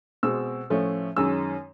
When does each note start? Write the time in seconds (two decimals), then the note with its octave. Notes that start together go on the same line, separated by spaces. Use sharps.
0.23 B2 G#3 C4 E6
0.70 A2 F3 A3 C#4
1.16 F#2 D#3 G#3 C#4 E6